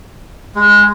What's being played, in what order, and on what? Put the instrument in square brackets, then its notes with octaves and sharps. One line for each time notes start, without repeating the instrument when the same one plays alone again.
[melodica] G#3